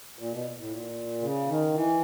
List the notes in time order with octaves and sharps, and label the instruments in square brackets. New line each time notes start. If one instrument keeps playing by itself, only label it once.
[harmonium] A#2
B2
A2
A#2
C#3
D#3
E3